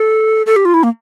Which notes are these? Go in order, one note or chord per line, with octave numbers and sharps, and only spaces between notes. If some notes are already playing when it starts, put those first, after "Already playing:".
Already playing: A4
A4
G4
F4
E4
A#3